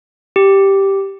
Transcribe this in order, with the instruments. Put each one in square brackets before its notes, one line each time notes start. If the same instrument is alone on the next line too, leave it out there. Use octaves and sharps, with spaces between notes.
[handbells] G4